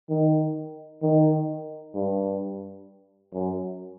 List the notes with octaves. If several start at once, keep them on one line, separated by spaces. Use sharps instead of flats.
D#3
D#3
G2
F#2